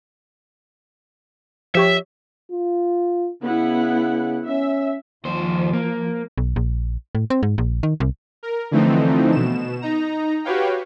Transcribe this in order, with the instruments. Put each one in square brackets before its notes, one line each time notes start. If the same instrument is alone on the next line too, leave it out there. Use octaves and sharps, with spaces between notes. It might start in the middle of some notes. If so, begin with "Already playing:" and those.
[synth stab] F3 G4 C#5 [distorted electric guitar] E5
[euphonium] F4
[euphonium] C#3 [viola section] B3 E4 F#5
[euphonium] C#4 [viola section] E5
[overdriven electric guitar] D#2 C5 [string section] F3
[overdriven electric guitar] A#3
[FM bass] B1
A#1
A2
C4
G#2
A#1
D#3
C2
[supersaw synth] A#4
D3 E3 F3 A3 C4 D#4
B2 E7
D#4 A#5
F#4 G4 B4 C#5 F5 G5